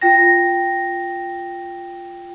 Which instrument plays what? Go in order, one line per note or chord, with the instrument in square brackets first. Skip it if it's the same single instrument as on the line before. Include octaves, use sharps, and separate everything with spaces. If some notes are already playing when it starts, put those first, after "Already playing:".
[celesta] F4 G5 A#6